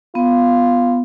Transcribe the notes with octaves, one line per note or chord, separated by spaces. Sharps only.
B3 F4